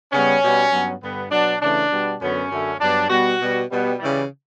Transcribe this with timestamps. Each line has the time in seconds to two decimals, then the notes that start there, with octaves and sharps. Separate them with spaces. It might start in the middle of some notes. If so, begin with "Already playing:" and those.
0.12 C#3 G3 B3 C#4
0.42 B2 G3 B3
0.72 G2 F#3 B3
1.02 G2 D3 G3 B3
1.31 B2 F#3 B3 D4
1.61 C#3 E3 A3 D4
1.91 B2 G3 B3
2.21 F#2 D3 F#3 B3 C#4
2.50 F#2 D3 F#3 A3
2.80 G2 F#3 B3 D4
3.10 B2 G3 B3 F#4
3.40 B2 G3 B3
3.70 B2 G3 B3
3.99 C#3 E3 G3